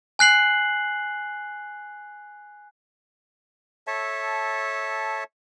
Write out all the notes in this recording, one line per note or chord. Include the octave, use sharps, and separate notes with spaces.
G#5 F#6 C7 F#7
A4 C#5 E5 A5